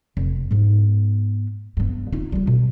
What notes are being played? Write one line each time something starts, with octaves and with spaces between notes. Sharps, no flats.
F1
G#2 B3
G2 B3
D#4 F4
G3 B3
B2